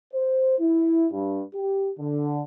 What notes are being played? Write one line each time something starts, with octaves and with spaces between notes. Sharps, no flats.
C5
E4
G2
G4
D3